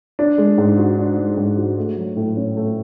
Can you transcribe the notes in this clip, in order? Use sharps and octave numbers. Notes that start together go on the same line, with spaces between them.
D4
G#3
G#2
F#4
D4
G#3
G#2
F#4
A3
F#3
A2
C#4
A3